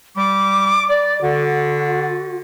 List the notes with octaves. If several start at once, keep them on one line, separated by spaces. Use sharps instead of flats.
G3 D6
D5
D3 F#4